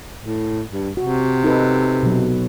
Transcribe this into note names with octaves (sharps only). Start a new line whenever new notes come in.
A2
G2
C3 F#4
D#4 A4 B4
B2 F#3